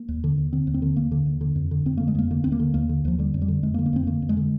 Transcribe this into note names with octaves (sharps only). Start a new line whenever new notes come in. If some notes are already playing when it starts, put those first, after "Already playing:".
Already playing: A#3
D#2
D3
D#2
D3 C4
D#2
C4
D3
D#2 A#3
D3
D#2
D3
F2
D3
F2 C4
D3 A#3
G#3
F2 A#3
D3 A#3
D#2 C4
A#3
D3
D#2 A#3
D3
D#2 F3
D3 G3
F2
G3
D3
F2 G#3
A#3
D3
A#3
F2 C4
D3 A#3
F2
G#3
D3